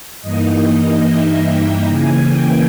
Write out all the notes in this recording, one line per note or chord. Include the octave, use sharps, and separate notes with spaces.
G2 E3 A#3 D#4 D#5
E5
G5
C#3 E3 A#3 G#5
G5